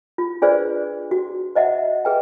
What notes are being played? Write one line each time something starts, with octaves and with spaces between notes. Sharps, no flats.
F4
D4 F4 G#4 B4 C5 D5
F#4
C5 D#5 E5 F#5
G#4 B4 G5